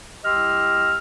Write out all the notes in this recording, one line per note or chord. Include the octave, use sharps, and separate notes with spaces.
C2 G4 D#5 C6 E6 F6